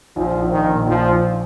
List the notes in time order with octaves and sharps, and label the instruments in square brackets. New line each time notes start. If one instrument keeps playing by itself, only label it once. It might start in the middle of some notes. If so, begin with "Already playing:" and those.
[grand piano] A#1 [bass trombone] F3
[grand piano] A#1
[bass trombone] D#3
[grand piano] A#2
[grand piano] A#1 [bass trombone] F3
[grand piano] A#1